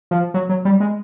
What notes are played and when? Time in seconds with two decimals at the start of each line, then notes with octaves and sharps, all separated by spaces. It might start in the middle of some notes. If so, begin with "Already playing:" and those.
0.11 F3
0.34 F#3
0.49 F#3
0.65 G3
0.80 G#3